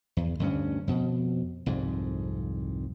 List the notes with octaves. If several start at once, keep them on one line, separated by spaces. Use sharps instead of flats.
E2
D2 G2 C#4
F2 B2
C2 F2 G#2